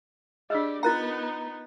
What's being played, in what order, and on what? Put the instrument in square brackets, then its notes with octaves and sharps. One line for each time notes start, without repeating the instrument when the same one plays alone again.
[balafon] D4 G#4 [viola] G4 D5 [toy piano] D#5 E6
[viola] B3 D#4 [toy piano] F4 A#4 G5 [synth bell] A#5 F#6 A6